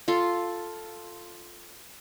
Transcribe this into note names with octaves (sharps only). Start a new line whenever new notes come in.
F4 A4 C6